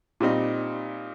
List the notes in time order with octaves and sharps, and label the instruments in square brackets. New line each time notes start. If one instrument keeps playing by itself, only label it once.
[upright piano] A#2 G3 C4 D#4